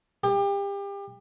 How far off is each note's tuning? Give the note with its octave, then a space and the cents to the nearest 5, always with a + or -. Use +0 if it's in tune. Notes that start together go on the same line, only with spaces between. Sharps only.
G4 +30